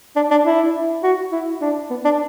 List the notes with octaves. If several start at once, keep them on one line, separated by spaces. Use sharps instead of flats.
D4
D4
E4
F#4
E4
D4
B3
D4